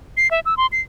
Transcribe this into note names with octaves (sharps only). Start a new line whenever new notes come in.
C7
E5
E6
C6
C7